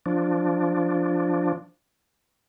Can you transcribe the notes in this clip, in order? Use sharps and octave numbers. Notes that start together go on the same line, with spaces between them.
F3 D4